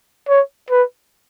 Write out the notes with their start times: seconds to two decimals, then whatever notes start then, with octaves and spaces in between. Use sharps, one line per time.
0.28 C#5
0.70 B4